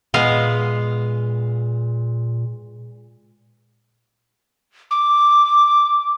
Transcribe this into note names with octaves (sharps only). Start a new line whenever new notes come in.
A#2 G#3 B3 F5
D6